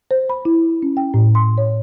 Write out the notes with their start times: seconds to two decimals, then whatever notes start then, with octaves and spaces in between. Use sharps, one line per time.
0.11 C5
0.30 B5
0.45 E4
0.83 C#4
0.97 G5
1.14 A2
1.35 C6
1.58 C#5